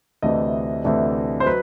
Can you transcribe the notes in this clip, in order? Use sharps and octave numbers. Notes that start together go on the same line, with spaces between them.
D2 C3 E3 A3 D4 D#5
D2 C3 E3 A3 D4
C5
F#3 B4